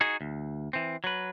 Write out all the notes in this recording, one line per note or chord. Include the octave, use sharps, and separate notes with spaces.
D#4 F#4 G#4
D2
E3 C4
F#3 B4